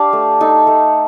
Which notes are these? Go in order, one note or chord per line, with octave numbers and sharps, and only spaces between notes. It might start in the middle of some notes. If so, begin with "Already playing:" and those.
Already playing: D4 G4 D5 F5
A3
D#4 A4
A3